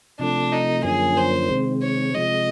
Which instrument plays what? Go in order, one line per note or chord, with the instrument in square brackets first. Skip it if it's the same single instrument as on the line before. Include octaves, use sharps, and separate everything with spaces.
[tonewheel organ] C3 F3 A3 [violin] D4
[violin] D#4
[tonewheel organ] F#2 D3 F3 A#3 C#4 [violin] G#4
[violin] C5
[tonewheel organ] C3 D#3 G#3 C4
[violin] C#5
[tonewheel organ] C3 F3 G#3 [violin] D#5